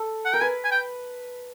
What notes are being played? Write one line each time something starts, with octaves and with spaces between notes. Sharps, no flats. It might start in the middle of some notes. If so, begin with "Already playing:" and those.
Already playing: A4
F#5
A#4 G5
B4 G#5
G#5
G5